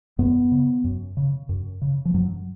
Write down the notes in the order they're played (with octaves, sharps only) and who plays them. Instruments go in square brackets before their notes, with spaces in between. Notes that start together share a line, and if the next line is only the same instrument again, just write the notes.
[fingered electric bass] F#2 B3
C#3
F#2
C#3
F#2
C#3
F3
F#2 F#3